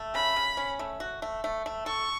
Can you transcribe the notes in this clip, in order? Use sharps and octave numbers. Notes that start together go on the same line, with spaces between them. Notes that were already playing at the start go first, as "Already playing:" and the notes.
Already playing: A3
C#3 B5
C#3
C#4
A3
F#4
A3
A3
A3
A4 C#6